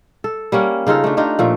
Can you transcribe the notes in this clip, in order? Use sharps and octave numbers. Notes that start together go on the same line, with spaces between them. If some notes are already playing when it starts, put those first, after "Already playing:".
A4
G3 A#3 C#4 F#5
C#3 D#4 F4 A4
A3 D4
D4 D#4 F4 G4
A#2 F3 A3